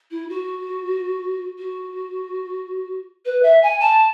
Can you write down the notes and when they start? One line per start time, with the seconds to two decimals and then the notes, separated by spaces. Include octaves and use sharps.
0.10 E4
0.29 F#4
1.58 F#4
3.25 B4
3.42 E5
3.62 G#5
3.80 A5